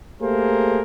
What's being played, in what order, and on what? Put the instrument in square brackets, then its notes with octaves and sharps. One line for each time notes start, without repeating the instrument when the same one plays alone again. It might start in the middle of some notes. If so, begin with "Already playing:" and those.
[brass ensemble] A3 A#3 G4 G#4 A#4 C5